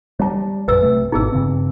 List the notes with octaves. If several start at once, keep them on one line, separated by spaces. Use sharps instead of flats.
G3 C#5 A5
A#1 F#2 B4 E6
C3 A3
G#1 B2 D#4 G#4 E6
G2 C#3 C4